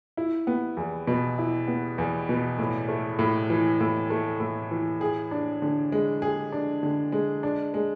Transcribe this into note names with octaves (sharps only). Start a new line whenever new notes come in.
E4
B3
E2
B2
E4
B3
E2
B2
A2
A3
A2
E3
A2
A3
A2
E3
G#4
D4
D3
G#3
G#4
D4
D3
G#3
D4
G#3